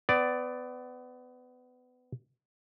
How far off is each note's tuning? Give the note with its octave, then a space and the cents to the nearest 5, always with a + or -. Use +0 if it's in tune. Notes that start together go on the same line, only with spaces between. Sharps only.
B3 +25 D5 +0